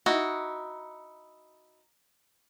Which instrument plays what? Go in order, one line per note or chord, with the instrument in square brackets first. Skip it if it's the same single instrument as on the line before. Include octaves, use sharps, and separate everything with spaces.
[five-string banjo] D#4 E4 F#4